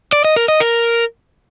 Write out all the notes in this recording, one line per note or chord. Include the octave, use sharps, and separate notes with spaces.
D5
D#5
A#4
D#5
A#4